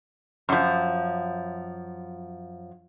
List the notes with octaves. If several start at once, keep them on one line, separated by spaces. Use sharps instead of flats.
F#2 F3